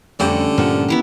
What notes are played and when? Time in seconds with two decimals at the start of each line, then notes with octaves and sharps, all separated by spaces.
0.20 F2 D3 G3 A3 C#4 F#4 G4
0.58 G2 A#2 F3 A3 A#4 F#5 E7
0.88 B3 E4 G4